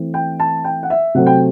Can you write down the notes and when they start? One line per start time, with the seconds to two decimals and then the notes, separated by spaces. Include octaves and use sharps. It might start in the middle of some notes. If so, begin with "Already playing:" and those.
Already playing: E3 A3 C4
0.14 G5
0.40 A5
0.64 G5
0.83 F#5
0.90 E5
1.15 C3 F#3 A3 C4 F#5
1.26 G5